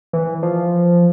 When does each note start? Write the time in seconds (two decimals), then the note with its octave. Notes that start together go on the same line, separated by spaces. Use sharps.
0.13 E3
0.43 F3